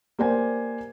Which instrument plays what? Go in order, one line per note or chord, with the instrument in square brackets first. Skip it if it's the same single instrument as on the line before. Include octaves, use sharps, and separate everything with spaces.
[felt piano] A#3 G4 C5 D5 G#5